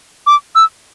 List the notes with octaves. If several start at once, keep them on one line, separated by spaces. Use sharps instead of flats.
D6
E6